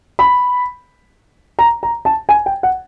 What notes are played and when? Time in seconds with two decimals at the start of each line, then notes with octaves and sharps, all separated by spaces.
0.19 B5
1.59 A#5
1.83 A#5
2.05 A5
2.29 G#5
2.46 G5
2.63 F#5